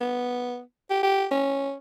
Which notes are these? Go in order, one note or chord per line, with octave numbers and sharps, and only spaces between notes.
B3
G4
G4
C#4